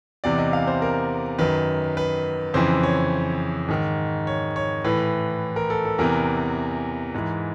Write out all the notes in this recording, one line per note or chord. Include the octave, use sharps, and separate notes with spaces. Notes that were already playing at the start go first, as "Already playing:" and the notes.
E2 C3 E3 D5
D#5
F5
C5
A#4
F#2 D#3 B4
B4
F2 C#3 E3 C5
C#5
G#2 D#3
C#5
C#5
A2 E3 B4
A#4
A4
A4
E2 C3 E3 A#4
G#2 E3